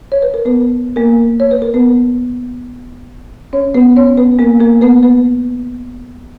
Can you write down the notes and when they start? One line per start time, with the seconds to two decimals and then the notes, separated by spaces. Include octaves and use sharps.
0.12 C#5
0.22 B4
0.34 A#4
0.45 B3 B4
0.96 A#3 A#4
1.40 C#5
1.51 B4
1.62 A#4
1.74 B3 B4
3.53 C#4 C#5
3.74 B3 B4
3.96 C#4 C#5
4.17 B3 B4
4.39 A#3 A#4
4.60 A#3 A#4
4.81 B3 B4
5.03 B3 B4